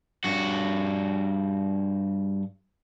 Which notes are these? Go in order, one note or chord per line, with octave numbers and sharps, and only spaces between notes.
G2 F#4